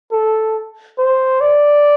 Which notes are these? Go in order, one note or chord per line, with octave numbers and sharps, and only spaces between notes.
A4
C5
D5